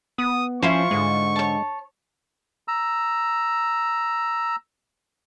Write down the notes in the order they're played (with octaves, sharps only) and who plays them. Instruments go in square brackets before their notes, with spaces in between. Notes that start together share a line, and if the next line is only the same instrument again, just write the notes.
[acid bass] B3 [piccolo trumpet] D#6
[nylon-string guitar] F3 [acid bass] C#4 [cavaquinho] E4 F4 C5 [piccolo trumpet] C#6
[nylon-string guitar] G#2 D3 [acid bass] G#3
[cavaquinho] C#5 A5
[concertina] A#5 E6